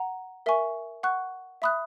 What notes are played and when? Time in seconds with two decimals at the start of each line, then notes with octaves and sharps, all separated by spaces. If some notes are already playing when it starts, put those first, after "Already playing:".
Already playing: F#5 A#5
0.46 A#4 E5 G#5 C#6
1.03 F#5 C#6 F#6
1.62 E5 B5 D#6 F#6